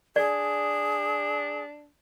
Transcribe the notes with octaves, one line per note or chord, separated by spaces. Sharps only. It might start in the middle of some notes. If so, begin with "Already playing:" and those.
D4 G#4 D5